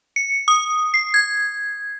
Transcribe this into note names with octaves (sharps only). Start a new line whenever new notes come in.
C#7
D#6
C7
G#6